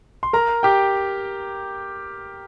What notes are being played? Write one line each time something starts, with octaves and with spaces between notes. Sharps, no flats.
C6
A#4 A#5
G4 G5